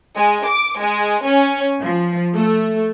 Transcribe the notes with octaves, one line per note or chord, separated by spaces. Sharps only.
G#3
D6
G#3
C#4
F3
A3